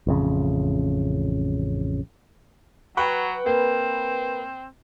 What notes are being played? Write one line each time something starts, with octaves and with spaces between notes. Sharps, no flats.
A1 F2 C#3
F#3 B4 F#5 G5 C#6
A#3 C4